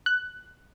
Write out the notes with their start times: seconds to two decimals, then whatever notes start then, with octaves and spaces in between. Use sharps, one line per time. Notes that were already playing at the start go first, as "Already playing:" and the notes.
0.06 F#6